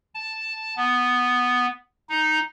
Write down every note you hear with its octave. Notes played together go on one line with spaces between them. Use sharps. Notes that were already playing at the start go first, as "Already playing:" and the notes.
A5
B3
D#4